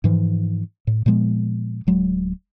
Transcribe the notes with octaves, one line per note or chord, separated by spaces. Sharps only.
G#2 E3 F3
A2
A#2 F3 G#3 B3
D1 F#3 G#3